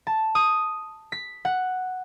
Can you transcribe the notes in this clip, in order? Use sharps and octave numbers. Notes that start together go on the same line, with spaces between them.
A5
D#6
B6
F#5